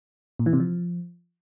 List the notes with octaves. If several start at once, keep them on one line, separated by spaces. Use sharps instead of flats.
A#2
E3
C3
F3